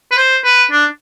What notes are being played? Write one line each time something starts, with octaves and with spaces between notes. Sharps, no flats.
B4
C5
B4
D4